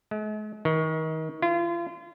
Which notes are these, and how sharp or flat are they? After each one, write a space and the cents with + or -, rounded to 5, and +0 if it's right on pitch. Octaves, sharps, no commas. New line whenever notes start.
G#3 +45
D#3 +30
F4 -35